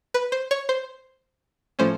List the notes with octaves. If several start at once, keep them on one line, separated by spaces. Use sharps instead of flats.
B4
C5
C#5
C5
A2 F3 A3 C#4 C5